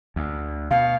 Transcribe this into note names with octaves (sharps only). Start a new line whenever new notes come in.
D2
B2 F5